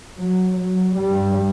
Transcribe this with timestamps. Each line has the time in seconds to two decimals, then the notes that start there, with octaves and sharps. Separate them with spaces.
0.20 F#3
0.59 F#3
0.97 G2 G3